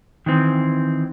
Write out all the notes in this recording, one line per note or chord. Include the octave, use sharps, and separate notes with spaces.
D#3 E3 C4